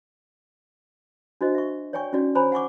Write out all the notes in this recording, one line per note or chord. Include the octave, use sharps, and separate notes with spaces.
D4 F#4 C5 D#5
E5 C#6
C#5 D5 G5 G#5 C#6
C#4 D#4 F#4 D5
C5 C#5 G#5 A#5 B5
F#5 G#5 C#6 D6